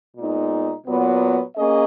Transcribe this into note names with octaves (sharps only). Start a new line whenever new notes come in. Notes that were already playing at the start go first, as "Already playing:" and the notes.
A#2 G#3 B3 D#4
A#2 F#3 B3
A#3 C#4 G#4 D#5